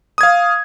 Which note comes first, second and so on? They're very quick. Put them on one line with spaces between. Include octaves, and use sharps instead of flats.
D#6 G#6 F5